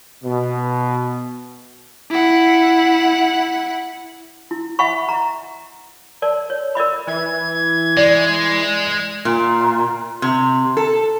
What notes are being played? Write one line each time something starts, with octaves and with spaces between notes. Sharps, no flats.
B2
E4 F#5
E4
E5 F#5 G#5 B5 C#6
D#5 A#5
A#4 D5 A5
C#5
A#4 D5 D#5 B5
E3 G#6
G#3 D5
A#2
C3
A4